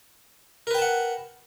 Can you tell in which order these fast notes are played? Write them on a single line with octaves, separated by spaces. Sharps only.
A#4 B4 G5 A5 F#5